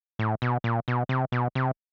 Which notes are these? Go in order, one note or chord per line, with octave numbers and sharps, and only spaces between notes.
A2
B2
A#2
B2
C3
B2
C3